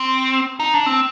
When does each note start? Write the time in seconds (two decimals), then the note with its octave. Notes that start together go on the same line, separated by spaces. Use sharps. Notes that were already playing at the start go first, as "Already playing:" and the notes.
Already playing: C4
0.60 D#4
0.74 D4
0.86 C4